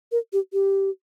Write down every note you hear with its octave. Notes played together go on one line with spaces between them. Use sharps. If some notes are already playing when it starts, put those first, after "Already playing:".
A#4
G4
G4